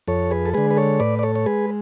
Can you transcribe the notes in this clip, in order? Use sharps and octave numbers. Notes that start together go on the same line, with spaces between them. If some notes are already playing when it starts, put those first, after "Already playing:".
F2 A4 C#5
G#4 B4
A4
D3 G#3 G#4 B4
B4
A4 C#5
A2 B4 D5
D5
A4 C#5
C#5
G#3 G#4 B4